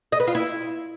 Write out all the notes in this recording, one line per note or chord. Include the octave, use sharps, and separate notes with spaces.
D#5
B4
F4
E4